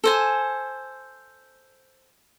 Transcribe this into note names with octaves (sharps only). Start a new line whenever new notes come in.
A4 C5 G#5